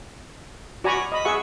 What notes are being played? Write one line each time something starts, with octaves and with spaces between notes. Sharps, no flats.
F#4 D5 G#5 A#5 B5 C#6
D#5 B5
G#4 E5 F#5 C#6